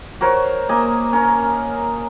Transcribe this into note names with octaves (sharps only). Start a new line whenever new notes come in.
F#4 A#4 C5 C#5
A#3 D#5 G#5
C#4 A#4